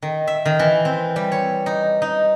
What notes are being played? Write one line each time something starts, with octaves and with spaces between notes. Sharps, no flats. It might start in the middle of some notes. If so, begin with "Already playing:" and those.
D#3
E5
D#3
E3
C4
G3
C#5
D#4
D#4